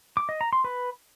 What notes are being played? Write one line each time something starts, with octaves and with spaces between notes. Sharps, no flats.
D6
D#5
A#5
C6
B4